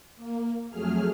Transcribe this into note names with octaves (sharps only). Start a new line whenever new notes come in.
A#3
F2 F#3 A3 G#4 F6